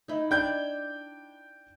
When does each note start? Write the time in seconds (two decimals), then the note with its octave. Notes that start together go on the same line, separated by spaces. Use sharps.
0.08 D#4 E4
0.31 D4 G5 G6 G#6